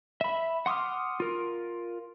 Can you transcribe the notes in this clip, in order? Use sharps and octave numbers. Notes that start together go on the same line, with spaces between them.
E5 B5
F#5 C6 D6 D#6 F6
F4 A#4